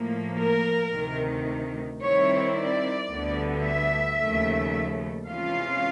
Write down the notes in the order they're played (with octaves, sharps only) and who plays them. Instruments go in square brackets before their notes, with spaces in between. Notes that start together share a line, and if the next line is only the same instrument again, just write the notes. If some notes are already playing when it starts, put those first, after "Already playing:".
Already playing: [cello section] A2 F3 A#3
A#4
D2 C3 D#3
D#3 G3 C4 E4 C#5
D5
D2 D3 G3 B3
E5
D#2 C#3 F3 A3
C3 E3 G#3 C#4 F4 F5